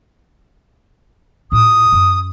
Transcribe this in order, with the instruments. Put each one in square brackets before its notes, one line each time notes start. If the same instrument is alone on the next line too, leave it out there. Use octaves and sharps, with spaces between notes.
[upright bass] A2 F4 [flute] D#6
[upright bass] F#2